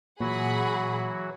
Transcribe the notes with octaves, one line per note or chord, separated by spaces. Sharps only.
A#2 E3 F#3 F#4 G#4 F#5 B5